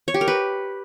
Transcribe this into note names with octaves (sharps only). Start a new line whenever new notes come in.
C#5
G4
A#4
B4